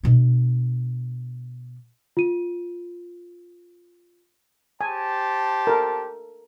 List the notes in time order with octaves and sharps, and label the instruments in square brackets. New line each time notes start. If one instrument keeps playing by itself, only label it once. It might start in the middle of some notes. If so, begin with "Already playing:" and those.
[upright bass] B2 D4
[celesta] F4 D#7
[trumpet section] G4 C5 A5 [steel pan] G#5
[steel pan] A4 A#4